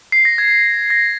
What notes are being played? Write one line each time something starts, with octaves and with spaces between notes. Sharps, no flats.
C7
A#6
G#6
A#6